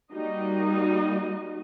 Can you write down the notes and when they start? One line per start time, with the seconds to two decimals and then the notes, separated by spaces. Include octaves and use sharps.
0.11 G3 A#3 D#4 F#4 D#5